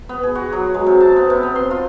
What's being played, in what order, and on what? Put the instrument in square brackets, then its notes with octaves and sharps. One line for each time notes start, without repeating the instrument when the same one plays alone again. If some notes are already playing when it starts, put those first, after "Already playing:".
[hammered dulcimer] B3
G#4
F#4
F#3
G#3
C3
A5
B3
C3
B3
C6
F4